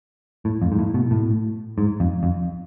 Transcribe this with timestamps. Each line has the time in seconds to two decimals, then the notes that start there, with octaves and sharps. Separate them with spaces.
0.45 A2
0.62 F2
0.72 G#2
0.79 A2
0.94 B2
1.11 A2
1.78 G#2
2.00 F2
2.23 F2